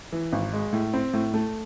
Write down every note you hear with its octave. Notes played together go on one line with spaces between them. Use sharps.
E3
G#1
G#3
A2
C4
A2
A3